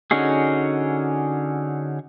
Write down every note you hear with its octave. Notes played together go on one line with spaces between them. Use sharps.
D3 C#4 D#4 F#4 G#4